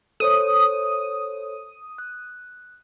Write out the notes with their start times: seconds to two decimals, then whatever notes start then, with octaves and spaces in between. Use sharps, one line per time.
0.20 A4 C5 C#5 D#6
1.98 F#6